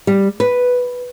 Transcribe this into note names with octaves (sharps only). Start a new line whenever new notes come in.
G3
B4